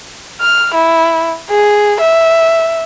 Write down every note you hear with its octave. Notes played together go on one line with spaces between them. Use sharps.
F6
E4
G#4
E5